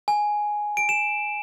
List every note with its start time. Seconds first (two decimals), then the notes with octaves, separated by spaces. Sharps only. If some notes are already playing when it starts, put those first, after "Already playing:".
0.08 G#5
0.77 D7
0.89 E7